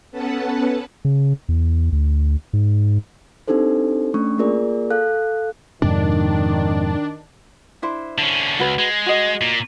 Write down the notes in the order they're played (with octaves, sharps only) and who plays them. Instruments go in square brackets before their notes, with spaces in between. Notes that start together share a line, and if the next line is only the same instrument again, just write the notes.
[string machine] B3 C#4 A4 B4 F#5 A5
[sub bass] C#3
E2
D2
G#2
[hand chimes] C4 D4 D#4 G4 A4 C5
A3 C#4 D4 C#6
A#3 F4 G#4 A#4 D5
A4 F5 F#6
[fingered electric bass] F2 G#2 C3 [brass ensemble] D#3 [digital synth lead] D4
[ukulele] D4 E4 C5
[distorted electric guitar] D3 C#4
[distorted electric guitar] C#2 [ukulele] F#4 B4
[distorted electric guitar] G#3
[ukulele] F#4 D#5
[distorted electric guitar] A#2